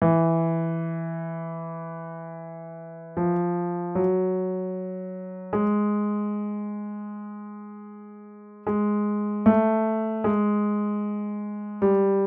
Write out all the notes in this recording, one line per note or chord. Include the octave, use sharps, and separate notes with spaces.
E3
F3
F#3
G#3
G#3
A3
G#3
G3